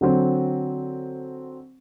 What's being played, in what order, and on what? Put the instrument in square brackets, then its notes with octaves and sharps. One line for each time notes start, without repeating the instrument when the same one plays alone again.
[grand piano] D3 F#3 C4